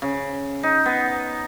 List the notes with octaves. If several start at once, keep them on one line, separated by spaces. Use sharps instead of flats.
C#3
D#4
B3